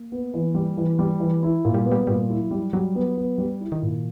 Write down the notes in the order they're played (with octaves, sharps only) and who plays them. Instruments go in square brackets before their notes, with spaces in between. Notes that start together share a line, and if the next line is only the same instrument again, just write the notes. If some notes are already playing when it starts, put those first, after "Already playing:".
Already playing: [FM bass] A#3
[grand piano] B3
E3
G3
E3
G3
E3
[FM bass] G#3 [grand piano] E4
[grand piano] A#2
[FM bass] G3
[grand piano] B3
[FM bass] G3
[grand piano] A#2 [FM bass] G3
[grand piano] E4
[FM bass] F#3
[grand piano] G3
[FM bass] F#3 [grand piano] G3
[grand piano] B3
B3
G3
E4
[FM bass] D#3
[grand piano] A#2